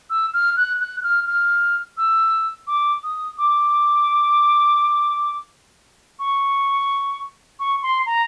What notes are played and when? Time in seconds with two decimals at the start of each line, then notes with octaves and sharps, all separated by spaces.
0.10 E6
0.34 F6
0.57 F#6
0.80 F#6
1.03 F6
1.27 F6
1.98 E6
2.67 D6
3.03 D#6
3.38 D6
6.19 C#6
7.60 C#6
7.82 C6
8.06 A#5